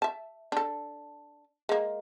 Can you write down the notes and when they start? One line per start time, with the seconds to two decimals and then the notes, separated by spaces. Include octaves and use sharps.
0.02 E5 A5
0.52 D4 A4
1.69 G#3 A#3